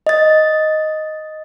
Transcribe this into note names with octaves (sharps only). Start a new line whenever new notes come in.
D#5 A6